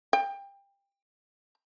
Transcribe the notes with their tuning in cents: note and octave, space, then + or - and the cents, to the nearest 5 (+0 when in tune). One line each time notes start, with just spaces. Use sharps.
G5 +25